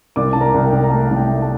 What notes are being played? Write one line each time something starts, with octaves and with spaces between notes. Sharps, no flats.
C2 D5 D6
C2 A5
A#4 A#5
C2
G5
C2
A#5
A3 A5
C2
G5
A3
A5